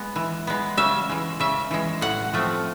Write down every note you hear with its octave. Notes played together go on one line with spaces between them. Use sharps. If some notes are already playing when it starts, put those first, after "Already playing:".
Already playing: G#3 B3
E3
G#3 B3
C#3 E5
E3 G#3
C#3 E5
E3 G#3
A2 F#5
F3 A3 C4